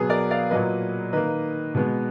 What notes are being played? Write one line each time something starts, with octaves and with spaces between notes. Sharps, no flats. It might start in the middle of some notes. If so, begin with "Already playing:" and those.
Already playing: B2 F#3 B3 G#4 B4
A#4 D5
D5 F5
A#2 F#3 A#3 B4 D#5
D#3 A#3 B4 D#5
B2 G#3 B3